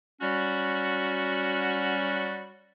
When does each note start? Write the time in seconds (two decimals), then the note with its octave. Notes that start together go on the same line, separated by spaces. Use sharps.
0.21 F#3 G3 C#4 F#4